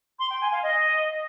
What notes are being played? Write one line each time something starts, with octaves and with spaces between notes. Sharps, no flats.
C6
G5
G#5
F5
D#5